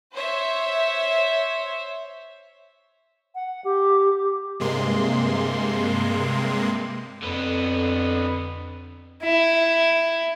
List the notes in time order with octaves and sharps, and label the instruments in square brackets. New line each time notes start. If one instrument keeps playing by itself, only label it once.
[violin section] C5 C#5 E5
[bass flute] F#5
G4
[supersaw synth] G2 C3 G#3 A#3 C6
[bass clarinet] F2 [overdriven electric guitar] D3 B3
[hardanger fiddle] E4